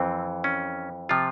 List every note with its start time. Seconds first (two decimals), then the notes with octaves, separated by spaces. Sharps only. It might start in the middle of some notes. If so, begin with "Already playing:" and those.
Already playing: F2 E3 C4
0.44 C#4
1.09 C3 F3 F4